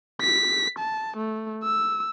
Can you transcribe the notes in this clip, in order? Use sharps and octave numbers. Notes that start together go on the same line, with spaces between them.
B6
A5
A3
E6